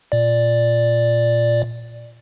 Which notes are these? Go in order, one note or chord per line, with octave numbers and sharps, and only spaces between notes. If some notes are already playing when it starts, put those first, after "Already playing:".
A#2 D5